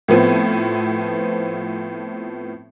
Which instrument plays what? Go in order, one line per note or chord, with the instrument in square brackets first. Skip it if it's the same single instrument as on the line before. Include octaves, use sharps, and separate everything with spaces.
[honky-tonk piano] A2 F3 B3 C4